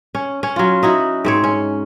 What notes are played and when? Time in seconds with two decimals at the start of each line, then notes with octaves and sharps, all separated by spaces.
0.15 C#4
0.43 C#4
0.56 F#3 F4
0.83 D#4 E4 F#4
1.25 G#2 C4 C#5
1.44 C#4